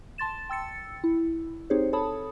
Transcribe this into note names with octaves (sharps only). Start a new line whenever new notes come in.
A5 C6 A6 E7
G5 E6 A6 C#7
E4
C4 D#4 G4 G#4 C5 C#5
A4 C#5 A5 B5 D#6